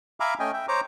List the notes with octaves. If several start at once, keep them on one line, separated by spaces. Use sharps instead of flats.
E5 F5 G#5 A#5 B5 D6
A3 C#4 D#5 G5 G#5
E5 G5
C5 C#5 A#5 D6